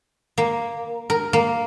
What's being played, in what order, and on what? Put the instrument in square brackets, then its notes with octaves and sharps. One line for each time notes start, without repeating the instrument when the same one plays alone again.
[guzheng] A#3
A#4
A#3